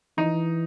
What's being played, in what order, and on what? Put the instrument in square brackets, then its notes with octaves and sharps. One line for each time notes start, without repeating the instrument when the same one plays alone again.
[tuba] E3 [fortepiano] D#4